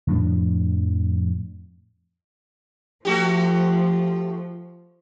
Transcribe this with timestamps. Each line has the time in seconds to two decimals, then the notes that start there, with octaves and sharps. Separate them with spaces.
0.07 F2 A2 F3 D4
3.05 F3 A3 F#4 G4